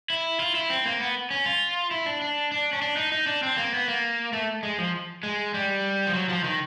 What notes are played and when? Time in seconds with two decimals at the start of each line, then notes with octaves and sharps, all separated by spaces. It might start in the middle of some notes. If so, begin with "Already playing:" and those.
0.10 E4
0.40 F4
0.55 E4
0.70 C4
0.86 A#3
1.00 B3
1.31 C#4
1.46 F4
1.91 E4
2.06 D4
2.22 D4
2.52 D4
2.73 C#4
2.82 D4
2.97 D#4
3.12 D#4
3.27 D4
3.43 C4
3.57 A#3
3.72 B3
3.88 A#3
4.33 A3
4.63 G#3
4.78 F3
5.23 G#3
5.54 G3
6.07 F3
6.14 F#3
6.29 F3
6.44 D#3